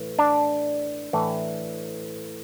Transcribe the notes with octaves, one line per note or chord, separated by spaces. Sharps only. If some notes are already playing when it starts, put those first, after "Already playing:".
Already playing: A2 E3
D4
A2 E3